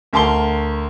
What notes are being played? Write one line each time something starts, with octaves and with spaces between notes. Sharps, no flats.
D2 A#4 A5 C6 G7